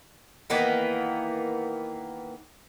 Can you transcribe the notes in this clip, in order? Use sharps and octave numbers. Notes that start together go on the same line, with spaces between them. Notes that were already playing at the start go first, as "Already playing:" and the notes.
D#3 E3 A#3 B3